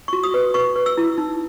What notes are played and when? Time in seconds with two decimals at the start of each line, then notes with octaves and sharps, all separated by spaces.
0.08 F#4 C#6
0.24 D#6
0.34 B4
0.54 B4 C#6
0.76 B4
0.86 E6
0.97 E4
1.18 D#4